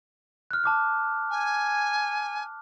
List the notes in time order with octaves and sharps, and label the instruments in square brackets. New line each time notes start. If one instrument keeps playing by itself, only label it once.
[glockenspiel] F6 F#6
A5 D6 F6
[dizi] G#5